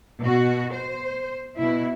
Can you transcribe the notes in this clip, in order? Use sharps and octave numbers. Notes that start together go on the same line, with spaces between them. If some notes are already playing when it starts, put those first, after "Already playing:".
B2 F#4
C5
B2 E4